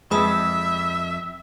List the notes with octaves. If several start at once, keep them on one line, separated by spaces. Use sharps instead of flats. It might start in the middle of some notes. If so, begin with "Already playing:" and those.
F2 G#3 E5 B5 D#6 E6